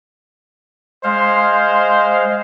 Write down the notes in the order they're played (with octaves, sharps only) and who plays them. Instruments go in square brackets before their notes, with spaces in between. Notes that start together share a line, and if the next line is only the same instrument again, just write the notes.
[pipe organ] G#3 F5 [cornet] C5